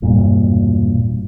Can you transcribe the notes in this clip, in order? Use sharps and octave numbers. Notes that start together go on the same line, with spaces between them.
E1 G2 A#2